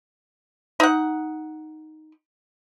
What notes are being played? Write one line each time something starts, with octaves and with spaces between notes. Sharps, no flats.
D#4 F#5